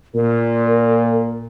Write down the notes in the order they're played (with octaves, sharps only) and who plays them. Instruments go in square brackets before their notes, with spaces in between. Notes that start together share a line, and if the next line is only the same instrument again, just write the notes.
[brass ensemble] A#2 [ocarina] A#4